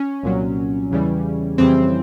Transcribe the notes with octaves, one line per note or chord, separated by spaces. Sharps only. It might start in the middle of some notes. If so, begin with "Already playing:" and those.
Already playing: C#4
C2 A#2 F#3
E2 C#3 E3 G3
F2 C#3 E3 G3 C4